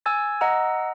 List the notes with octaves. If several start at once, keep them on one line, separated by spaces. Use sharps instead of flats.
G#5 E6 G#6 A6
D#5 F#5 A#5 E6